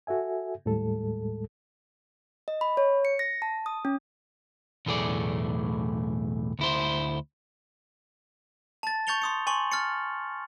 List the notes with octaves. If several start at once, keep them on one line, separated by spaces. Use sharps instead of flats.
F#4 A4 E5 G#5
D#2 A2 G3 G#3 A4
D#5
B5
C#5
C#7
A#6
A5
D#6
C#4
B1 E2 A2 A3 G#4 D5
D2 E4 C5
A5 A6
C#6 G6 A6 C#7 F7 G7
C6 D#6 C#7
G#5 C6 C#6 F#7
F6 A6 C#7